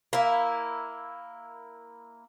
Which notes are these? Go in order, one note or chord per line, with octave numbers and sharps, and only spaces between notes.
A#3 E4